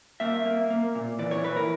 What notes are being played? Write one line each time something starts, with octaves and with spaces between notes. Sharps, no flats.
A#3 E5
A#3
A#3
A#2
E3 D5
C#5
E3 B4
A#4